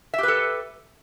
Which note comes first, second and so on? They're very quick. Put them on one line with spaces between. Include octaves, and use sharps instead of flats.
E5 G4 B4 A4